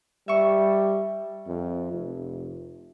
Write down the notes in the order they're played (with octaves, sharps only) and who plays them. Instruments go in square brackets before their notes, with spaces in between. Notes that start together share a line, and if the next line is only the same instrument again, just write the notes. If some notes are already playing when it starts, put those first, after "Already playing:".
[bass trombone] G3 [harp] E5 C#6
[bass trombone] F2
F1